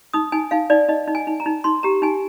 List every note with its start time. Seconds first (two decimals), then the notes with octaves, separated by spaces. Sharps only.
0.14 D#4 D#6
0.32 D#4 G#5
0.51 D#4 F5
0.70 D#4 D5
0.89 D#4 D#5
1.08 D#4
1.15 G#5
1.27 D#4
1.40 A#5
1.46 D#4
1.64 D#4 C6
1.83 G4 A#5
2.02 D#4 G#5